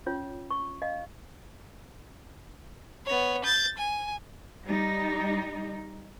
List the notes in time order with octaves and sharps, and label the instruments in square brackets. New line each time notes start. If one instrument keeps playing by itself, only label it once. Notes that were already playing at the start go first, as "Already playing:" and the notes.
[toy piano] C#4 F4 C#5
C#6
D#5 F5
[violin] B3 C#5
G6 A6
G#5
[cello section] G3 D#4